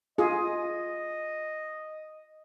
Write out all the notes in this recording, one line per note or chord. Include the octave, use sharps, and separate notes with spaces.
F4 G#4 D#5